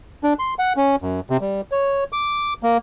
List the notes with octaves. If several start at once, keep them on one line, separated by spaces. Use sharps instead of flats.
D4
C6
F#5
C#4
F#2
C3
G3
C#5
D6
A#3